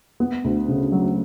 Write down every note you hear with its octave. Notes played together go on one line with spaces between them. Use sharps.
B3
D2
C#3
F#3